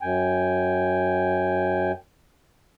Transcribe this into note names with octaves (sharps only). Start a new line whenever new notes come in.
F#2 G5 G#5